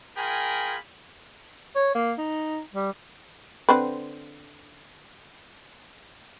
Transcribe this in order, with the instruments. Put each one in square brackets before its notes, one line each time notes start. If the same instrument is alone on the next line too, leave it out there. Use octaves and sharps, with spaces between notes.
[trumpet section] F4 G#4 A#4 G5 G#5 B5
[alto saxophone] C#5
A#3
D#4
G3
[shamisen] D3 C4 B4